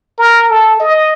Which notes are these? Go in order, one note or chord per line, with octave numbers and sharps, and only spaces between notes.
A#4
A4
D#5